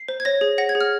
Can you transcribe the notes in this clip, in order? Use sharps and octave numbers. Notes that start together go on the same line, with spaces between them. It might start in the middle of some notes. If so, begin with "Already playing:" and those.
Already playing: C7
C5
G#6
C#5 A#6
G#4
F#5 A#6
G#6
G#4
F6